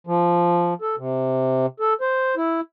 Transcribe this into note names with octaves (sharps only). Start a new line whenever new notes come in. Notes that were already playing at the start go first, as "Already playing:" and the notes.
F3
A4
C3
A4
C5
E4